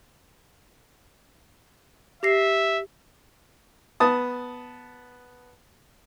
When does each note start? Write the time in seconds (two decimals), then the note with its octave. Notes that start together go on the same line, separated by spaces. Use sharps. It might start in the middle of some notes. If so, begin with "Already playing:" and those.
2.23 G4 E5 A#6 C7
4.00 B3 A5 D#6